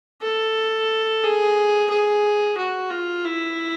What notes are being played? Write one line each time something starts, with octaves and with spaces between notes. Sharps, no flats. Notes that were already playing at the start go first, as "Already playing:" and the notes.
A4
G#4
G#4
F#4
F4
E4